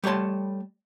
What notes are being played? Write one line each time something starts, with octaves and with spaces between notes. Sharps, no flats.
G3 A3 C#5 A5 C6